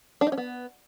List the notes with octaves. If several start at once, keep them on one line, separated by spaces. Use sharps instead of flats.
D4
D#4
C#4
B3